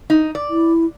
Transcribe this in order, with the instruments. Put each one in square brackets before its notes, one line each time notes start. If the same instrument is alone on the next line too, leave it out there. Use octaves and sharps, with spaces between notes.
[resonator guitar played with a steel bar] D#4
D5
[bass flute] E4